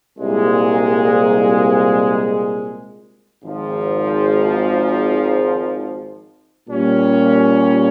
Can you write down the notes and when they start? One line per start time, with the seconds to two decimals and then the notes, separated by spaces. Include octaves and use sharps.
0.18 C2 A#2 G#3
3.43 G#1 G#2 F3
6.68 A#2 G3 C#4